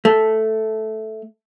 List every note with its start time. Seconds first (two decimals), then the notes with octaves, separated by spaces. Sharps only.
0.05 A3